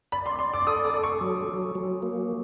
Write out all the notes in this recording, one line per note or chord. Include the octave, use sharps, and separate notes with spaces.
D5 B5
C6
D5 C6
D6
A4 D#6
D6
A4
C#6
F#3
F#3
F#3
A#3